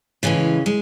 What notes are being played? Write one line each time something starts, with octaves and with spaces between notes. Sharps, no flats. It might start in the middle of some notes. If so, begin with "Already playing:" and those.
A2 C#3 E3 G#3 C#4
G#3